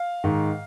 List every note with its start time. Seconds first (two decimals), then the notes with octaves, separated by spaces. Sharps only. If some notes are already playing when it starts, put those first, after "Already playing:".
Already playing: F5
0.24 G#2 D#3